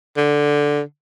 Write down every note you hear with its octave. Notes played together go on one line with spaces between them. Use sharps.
D3